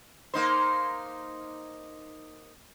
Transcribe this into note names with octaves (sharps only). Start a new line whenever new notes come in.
A#3 D#4 C5